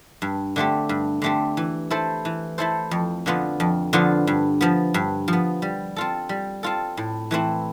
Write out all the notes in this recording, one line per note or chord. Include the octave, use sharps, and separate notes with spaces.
G2
D3 A3 C4 G4
G2
D3 A3 C4 G4
E3
A3 E4 A4 C5
E3
A3 E4 A4 C5
F2
D3 F3 B3 F4
F2
D3 F3 B3 F4
G2
F3 B3
G2
F3
B3
G3
C4 F4 A4
G3
C4 F4 A4
A2
E3 A3 C4 E4